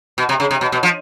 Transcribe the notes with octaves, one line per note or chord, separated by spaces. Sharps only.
B2
C3
C#3
C3
B2
B2
F3